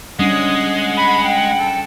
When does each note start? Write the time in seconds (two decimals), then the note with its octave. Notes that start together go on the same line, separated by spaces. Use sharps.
0.19 G3 G#3 C#4 D4 F#5 D#6
0.97 B5
1.24 G5
1.59 A4